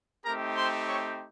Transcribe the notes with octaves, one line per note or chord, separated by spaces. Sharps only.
A3 C4 D#4 G4 A#4 A#5
C5 C6
C#5 C#6